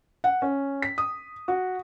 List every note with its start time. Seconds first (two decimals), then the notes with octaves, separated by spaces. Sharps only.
0.24 F#5
0.42 C#4
0.82 B6
0.98 D#6
1.48 F#4